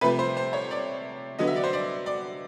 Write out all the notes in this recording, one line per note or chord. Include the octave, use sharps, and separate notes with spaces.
C3 F3 A3 B4
C5
C5
C#5
D5
D3 F#3 B3 D#5
E5
D5
C5
D5
D5